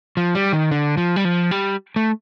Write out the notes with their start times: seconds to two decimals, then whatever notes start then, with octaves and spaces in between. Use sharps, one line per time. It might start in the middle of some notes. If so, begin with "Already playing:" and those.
0.17 F3
0.35 G3
0.53 D#3
0.71 D3
0.97 F3
1.16 G3
1.25 F3
1.51 G3
1.96 A3